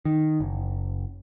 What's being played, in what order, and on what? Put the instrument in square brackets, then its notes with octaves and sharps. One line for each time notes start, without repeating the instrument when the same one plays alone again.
[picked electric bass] D#3
F#1